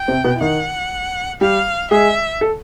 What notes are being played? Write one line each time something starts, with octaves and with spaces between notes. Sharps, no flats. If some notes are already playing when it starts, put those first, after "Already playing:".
Already playing: G5
C3 C4
B2 B3
E4
D#3 D#4 F#5
G3 G4 F5
G#3 G#4 E5
A4